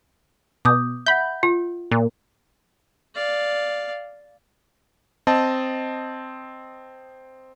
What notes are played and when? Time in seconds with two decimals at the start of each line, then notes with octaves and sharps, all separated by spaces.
0.65 B2 D6 D#6 G6
1.06 E5 F#5 B5 G6
1.43 F4
1.92 A#2
3.15 D5 F5
5.27 C4 D#5 A5